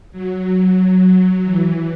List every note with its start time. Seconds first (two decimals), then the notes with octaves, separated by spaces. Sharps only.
0.12 F#3
0.45 F#3
1.43 E3